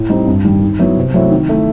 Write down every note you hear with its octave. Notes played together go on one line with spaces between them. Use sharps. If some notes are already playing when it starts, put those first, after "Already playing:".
Already playing: A2
G3 C4 D#4
G2
D#3 G3
D#3
F#3 B3 E4
C3
F#3 A3 C4 E4
D#3
A3 E4